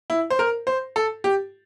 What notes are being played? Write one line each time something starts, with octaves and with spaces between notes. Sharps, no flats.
E4
C5
A#4
C5
A4
G4